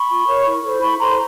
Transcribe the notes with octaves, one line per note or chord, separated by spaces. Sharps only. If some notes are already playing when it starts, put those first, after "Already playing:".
Already playing: B5 C#6
F4
A#4 C#5
E4
A4 C5
E4 B5 C#6
A4 C5 A#5 C6